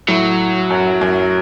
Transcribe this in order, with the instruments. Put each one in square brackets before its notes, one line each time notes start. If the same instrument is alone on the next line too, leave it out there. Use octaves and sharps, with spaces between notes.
[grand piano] A2 [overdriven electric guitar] F#3
[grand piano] F#2
F#2